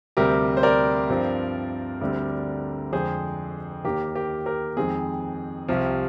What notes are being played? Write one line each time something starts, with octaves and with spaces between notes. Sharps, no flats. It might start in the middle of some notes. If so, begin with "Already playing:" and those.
D2 C3 G3 C4 G4 A#4
C5
A#4 D5
G2 F3 C4
D2 D3 G3 C4
F2 D3 G#3 G#4 C5
D#2 D#3 A#3 G4 A#4
G4 A#4
G4 A#4
F2 D#3 G#3 C4 G#4
C2 C3 F3